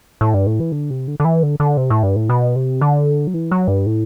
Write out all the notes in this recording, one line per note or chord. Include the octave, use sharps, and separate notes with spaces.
A2
G2
A2
E3
D3
C3
D3
D3
E3
D3
D3
C3
A2
G2
A2
B2
C3
D3
F#3
E3
F#3
G2
A2